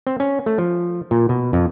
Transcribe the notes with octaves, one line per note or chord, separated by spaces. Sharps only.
C4
C#4
A3
F3
A#2
B2
F2